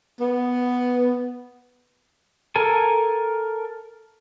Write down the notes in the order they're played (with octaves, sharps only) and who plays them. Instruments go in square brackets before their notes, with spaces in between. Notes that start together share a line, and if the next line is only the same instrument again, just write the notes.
[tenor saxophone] B3
[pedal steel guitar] A4 A#4 G#5